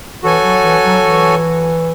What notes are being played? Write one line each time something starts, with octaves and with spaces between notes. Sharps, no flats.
E3 F#4 A4 C#5 G#5
F#3
E3
F#3
E3